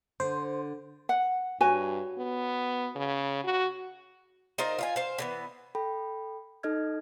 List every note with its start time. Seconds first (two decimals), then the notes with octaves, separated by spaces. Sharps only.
0.20 D3 C5
1.09 F#5
1.61 G2 F#4 C#5 G#5
2.18 B3
2.96 C#3
3.44 F#4
4.58 D#4 F4 A#4 C5
4.79 F4 F5 G#5
4.96 C5 F5
5.18 D3 E3 B3
5.75 A4 G5 B5
6.63 D#4 A4 D#5 F6 G#6